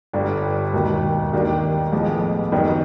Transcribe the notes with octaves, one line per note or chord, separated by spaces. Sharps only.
G1 G2 D3 G3
E1 D#2 D#3
D#2 D#3 G3 A#3 D4
A1 A2 F3 G#3 B3
F#2 D#3 G3 B3 D#4